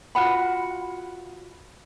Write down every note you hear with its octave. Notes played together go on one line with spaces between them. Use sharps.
F4 F#4 F#5 B5